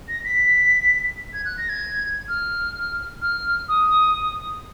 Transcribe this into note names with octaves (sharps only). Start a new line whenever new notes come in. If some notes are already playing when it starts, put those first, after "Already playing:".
A#6
B6
G#6
F#6
A#6
G#6
F6
F6
D#6